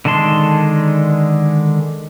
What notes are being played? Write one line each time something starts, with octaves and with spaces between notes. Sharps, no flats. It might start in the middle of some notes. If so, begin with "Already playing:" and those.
D3 D#3 G#3 A5 C6